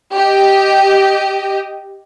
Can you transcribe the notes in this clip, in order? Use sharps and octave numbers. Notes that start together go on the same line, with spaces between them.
G4 D#5